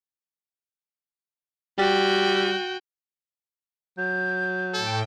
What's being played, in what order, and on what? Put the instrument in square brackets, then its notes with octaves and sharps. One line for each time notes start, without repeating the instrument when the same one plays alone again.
[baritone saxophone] G3 [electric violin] F#4 G5
[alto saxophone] F#3 [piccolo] G6
[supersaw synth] A2 G5 [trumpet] A4